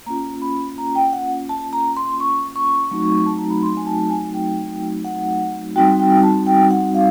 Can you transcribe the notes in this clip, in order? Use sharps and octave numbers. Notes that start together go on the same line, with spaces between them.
A#3 C#4 F4 A#5
B5
A#5
G5
F#5
A5
A#5
C6
C#6
C#6
F#3 A3 C4 D#4 F#4
A5
A#5
B5
C6
G#5
A5
A5
G#5
G5
F#5
G3 C4 D#4 F#4 G5
G5
A5
G5
F#5
F5